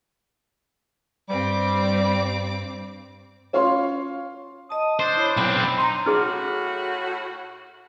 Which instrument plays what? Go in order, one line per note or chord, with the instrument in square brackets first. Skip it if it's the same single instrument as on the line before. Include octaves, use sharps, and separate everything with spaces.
[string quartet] G2 C4 D6 [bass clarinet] G3
[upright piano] C#4 F4 C#5 F5 C6
[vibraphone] D#5 A5 [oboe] D#6
[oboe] D4 [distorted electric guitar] C5
[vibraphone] E4 C#5 B5
[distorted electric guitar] B1 C4 [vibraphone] B5
[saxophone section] D#4 [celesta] A#5 C6
[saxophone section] A2 F#4 [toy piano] D#4 G#4 [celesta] F6